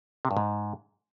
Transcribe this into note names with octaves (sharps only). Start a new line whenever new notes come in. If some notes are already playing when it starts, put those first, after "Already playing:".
C3
G2
G#2